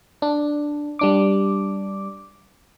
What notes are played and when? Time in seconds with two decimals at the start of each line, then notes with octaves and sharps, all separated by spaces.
0.22 D4
0.99 G3 D4 D6